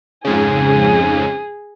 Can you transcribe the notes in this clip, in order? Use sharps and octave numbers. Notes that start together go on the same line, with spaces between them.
F2 G#2 C#3 G#4